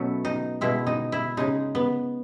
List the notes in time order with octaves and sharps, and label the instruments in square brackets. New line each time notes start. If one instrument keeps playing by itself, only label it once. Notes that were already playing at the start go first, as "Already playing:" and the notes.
Already playing: [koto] B2 F#3 A3 B3 C#4
D#4
B2 G#3 E4
D#4
E4
C#3 G#3 D#4
B3